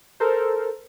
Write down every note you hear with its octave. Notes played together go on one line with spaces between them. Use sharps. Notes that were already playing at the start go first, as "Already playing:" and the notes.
A4 A#4 C5